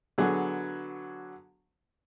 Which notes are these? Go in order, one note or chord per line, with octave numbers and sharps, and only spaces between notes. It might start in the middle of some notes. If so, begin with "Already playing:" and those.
D3 F#3 B3 G#4